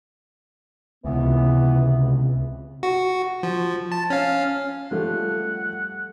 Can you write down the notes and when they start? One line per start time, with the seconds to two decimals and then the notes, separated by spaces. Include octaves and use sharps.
1.04 C#2 C3 E3 B3
2.83 F#4
3.43 F3
3.92 A5
4.10 C#4 F5
4.91 F3 G3 A3 F#5